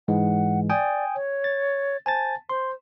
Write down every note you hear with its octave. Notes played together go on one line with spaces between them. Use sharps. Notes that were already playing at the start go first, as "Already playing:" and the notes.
G#2 E3 G#3 F#5
D5 G5 G#5 D#6
C#5
A6
C5 G#5 A5 A6
C5 C6